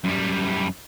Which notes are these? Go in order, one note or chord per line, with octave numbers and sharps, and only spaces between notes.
F#2 G3